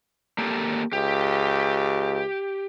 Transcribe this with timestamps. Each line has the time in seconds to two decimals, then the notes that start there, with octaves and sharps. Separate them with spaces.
0.38 A#3 G4 A4
0.93 C#2 G4